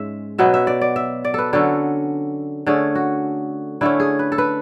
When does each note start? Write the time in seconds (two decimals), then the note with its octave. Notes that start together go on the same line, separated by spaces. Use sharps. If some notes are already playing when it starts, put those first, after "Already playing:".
Already playing: G#2 G#3 C#4 E5
0.38 B2 F#3 B3 E5
0.54 E5
0.67 D5
0.81 D5
0.96 E5
1.25 D5
1.34 A4 B4
1.53 D3 F#3 C#4 A4
2.66 D3 A3 C#4 G#4
2.95 F#4
3.81 D3 A3 C#4 E4
4.00 G#4
4.19 B4
4.32 A4
4.38 B4